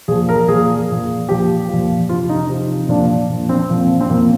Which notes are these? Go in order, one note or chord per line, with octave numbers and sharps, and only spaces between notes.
A#2 F3 G#4
A#4
A#2 F3 G#4
A#2 F3
A#2 F3 G4
A#2 F3
C3 F3 F4
D#4
C3 F3
A#2 F3 D4
A#2 F3
C4
A#2 F3
C4
A#2 F3 A#3